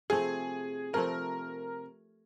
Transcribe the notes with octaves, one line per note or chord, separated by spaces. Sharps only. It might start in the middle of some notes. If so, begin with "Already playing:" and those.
C3 F3 A3 C4 G#4
C3 F3 A3 C4 A#4